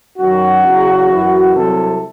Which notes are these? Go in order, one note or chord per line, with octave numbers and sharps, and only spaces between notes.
F#2 D#3 F#3 F#4
E2 C#3 F#3
F#2 E3
C2 C3 F#3 A4